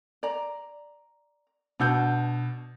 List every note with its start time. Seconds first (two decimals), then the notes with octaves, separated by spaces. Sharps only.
0.23 D5 A#5
1.80 B2 D4 F#5 E6 G6